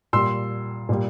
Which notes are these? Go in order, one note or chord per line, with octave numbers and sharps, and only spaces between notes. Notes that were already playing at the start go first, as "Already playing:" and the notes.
A#2 G3 C6 E6
A#2 G3